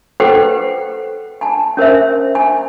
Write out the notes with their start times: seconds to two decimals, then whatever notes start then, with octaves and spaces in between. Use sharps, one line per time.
0.20 A4 B4 C5 F#5 G5
1.41 G#5 A5
1.77 C#4 A#4 C5 E5
2.35 G#5